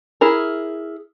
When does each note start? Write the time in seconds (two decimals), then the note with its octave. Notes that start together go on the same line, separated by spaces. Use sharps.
0.21 E4 G#4 A#4